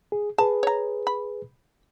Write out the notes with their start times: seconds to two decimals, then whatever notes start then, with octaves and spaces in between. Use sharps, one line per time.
0.12 G#4
0.38 G#4 B4 A5
0.63 C#5 A#5
1.07 B5